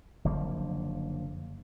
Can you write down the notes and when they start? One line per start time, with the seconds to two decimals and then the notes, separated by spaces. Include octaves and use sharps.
0.25 F#1 D3 F3 A#3